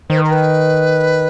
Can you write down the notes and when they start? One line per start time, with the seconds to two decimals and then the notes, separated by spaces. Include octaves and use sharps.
0.10 D#3 C5
0.17 B4
0.24 A#4
0.31 B4